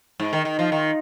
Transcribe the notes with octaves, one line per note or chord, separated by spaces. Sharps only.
G#2
D#3
D#3
F3
D#3